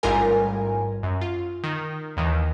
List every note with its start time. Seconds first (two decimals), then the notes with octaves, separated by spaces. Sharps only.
0.03 A1 G#2 G3 F4 A#4 G#5
1.03 F#2
1.21 F4
1.64 D#3
2.17 D#2 D#3 E3